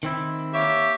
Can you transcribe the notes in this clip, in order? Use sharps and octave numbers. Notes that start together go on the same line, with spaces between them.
D#3 C4 E4
A#3 G4 C#5 E5